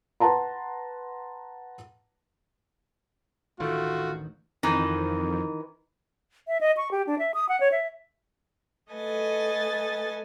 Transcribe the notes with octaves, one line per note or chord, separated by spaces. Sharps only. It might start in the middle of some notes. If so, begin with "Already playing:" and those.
B4 F#5 A5 A#5 C6
A1 D2 D#3 A3 F4 F#4
F2 D#3 E3 D#4
E5
D#5
C#6
G4
D4
E5
D#6
F#5
C#5
E5
A3 A4 B4 D#5 G#5 A6